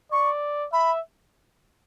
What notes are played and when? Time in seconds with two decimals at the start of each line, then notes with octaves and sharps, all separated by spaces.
0.12 D5 C#6
0.72 E5 B5